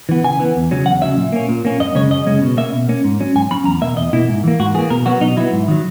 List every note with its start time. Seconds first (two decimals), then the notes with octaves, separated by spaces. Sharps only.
0.09 E3 B3
0.24 C#3 G#5
0.39 E3 B3
0.55 E2
0.71 C#3 F#3 C#4
0.86 E2 F#5
1.01 C#3 F#3 C#4 E5
1.17 A#2
1.32 A#3 C#4
1.49 A#2
1.65 A#3 C#4
1.80 F#2 D#5
1.95 C#3 G#3 C#4 C#5
2.11 F#2 D#5
2.26 C#3 G#3 C#4
2.42 B2
2.57 A#3 E5
2.61 C#4
2.73 B2
2.89 A#3 C#4
3.04 G#2
3.20 F#3 C#4
3.36 G#2 G#5
3.51 F#3 C#4 B5
3.65 E2 A#5
3.81 B2 A#3 E5
3.97 E2 D#5
4.13 B2 A#3 E4
4.29 G#2
4.44 E3 A#3
4.60 G#2 F#4
4.74 E3 G#4
4.79 A#3
4.90 B2 A#4
5.06 F#3 B3 F#4
5.21 B2 D#4
5.37 F#3 B3 E4
5.53 G#2
5.68 D#3 F#3